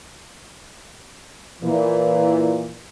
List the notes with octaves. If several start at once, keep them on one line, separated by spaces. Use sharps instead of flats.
A#2 E3